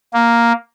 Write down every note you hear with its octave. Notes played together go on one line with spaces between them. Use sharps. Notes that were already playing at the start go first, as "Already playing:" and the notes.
A#3